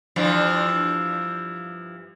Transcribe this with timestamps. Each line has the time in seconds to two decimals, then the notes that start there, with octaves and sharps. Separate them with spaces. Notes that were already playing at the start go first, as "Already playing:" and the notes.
0.16 G2 E3 F3